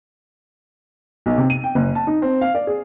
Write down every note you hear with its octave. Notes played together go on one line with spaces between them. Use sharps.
B1
C3
D#7
G5
F#1
A5
D#4
C4
F5
D5
G#4